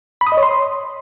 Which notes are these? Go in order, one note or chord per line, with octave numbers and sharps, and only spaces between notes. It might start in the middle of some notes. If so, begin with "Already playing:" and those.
B5
D#6
D#5
C#5
C6